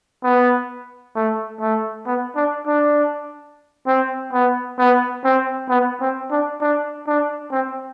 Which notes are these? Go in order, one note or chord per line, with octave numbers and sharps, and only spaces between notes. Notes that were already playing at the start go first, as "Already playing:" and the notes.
B3
A3
A3
B3
D4
D4
C4
B3
B3
C4
B3
C4
D4
D4
D4
C4